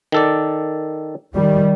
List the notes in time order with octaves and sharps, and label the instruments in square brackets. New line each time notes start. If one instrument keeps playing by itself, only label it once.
[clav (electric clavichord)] D#3 A4 D5
[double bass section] D#3 G3